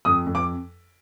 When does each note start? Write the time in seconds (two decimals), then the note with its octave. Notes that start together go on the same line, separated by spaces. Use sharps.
0.05 F2 D#6
0.26 F2
0.35 D6